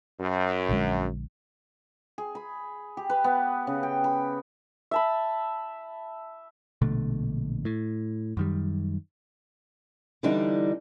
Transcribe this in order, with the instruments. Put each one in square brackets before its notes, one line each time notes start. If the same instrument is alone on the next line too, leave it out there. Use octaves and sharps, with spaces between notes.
[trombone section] F#2
[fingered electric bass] A#1 D3 G#3
[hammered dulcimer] G#4
B5
G4
B4
B3
C#3
G5
B5
[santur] E5 A5 B5
[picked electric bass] A#1 B2 D3 A3
A2
F#2 D#3 G3
[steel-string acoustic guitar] D3 E3 G3 D4 D#4